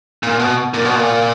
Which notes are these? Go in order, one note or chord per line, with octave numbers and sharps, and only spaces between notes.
A#2
B2
A#2
B2
A#2